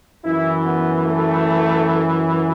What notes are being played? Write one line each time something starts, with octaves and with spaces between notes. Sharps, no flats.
F#2 E3 E4
B3
A3